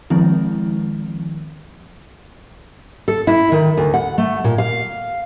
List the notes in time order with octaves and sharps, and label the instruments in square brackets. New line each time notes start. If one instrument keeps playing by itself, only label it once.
[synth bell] D#3 F3 G#3 C4 E4
[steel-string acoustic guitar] A4
E4
D#3
D2
F#5
A3
A#2
F5